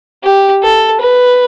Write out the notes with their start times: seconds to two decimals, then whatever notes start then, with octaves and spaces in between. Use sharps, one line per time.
0.24 G4
0.62 A4
1.00 B4